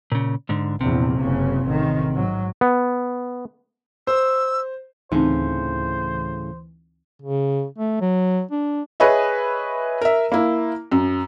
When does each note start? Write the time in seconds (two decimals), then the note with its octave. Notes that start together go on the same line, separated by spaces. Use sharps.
0.12 A#2 C#3
0.49 G#2 D3
0.81 A#1 E2 C3
1.21 F#1 C#3
1.68 A1 D#3
2.12 G#2 F#3
2.61 B3
4.07 C5 E6
5.12 D2 A2 C#3 E3 C4 D#4 C5
7.22 C#3
7.78 A3
8.01 F#3
8.51 D4
9.00 G#4 B4 C#5 D#5 E5
10.01 A#4 E5
10.32 A#3 E4
10.92 F#2